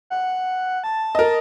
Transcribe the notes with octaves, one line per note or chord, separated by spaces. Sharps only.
F#5
A5
A#4 D#5